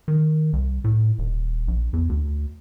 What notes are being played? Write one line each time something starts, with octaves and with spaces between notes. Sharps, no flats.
D#3
C2
A2
D#1
A#1
E2
D2